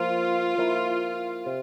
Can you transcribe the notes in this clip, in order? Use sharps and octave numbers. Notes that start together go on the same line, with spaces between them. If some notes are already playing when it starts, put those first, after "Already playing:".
Already playing: F3 A#3 F4
F3 A#3 E4
C3